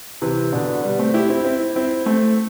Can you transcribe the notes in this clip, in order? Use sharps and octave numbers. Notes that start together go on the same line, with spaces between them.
C3 E3
B2 D3
G3 B3
A3 C4
E4 G4
C4 E4
C4 E4
C4 E4
A3 C4